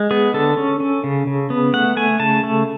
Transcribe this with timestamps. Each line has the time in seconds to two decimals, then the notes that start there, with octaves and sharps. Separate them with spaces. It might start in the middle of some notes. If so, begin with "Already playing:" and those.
Already playing: G#3
0.11 B3 G#4
0.34 D3 A4
0.57 C#4
0.80 C#4
1.04 C#3
1.27 C#3
1.50 B3
1.73 A3 F#5
1.97 A3 G#5
2.19 C#3 A5
2.43 A3